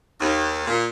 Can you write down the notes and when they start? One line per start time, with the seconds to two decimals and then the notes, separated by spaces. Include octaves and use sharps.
0.20 D#2
0.65 A#2